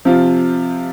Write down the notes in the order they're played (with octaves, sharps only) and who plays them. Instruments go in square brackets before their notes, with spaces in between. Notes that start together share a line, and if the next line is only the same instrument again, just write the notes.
[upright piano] C3 F3 C4 F4